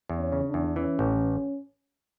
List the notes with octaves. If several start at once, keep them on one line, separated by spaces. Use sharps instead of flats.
E2
C#4
C#3
D4
E2
E3 C#4
A1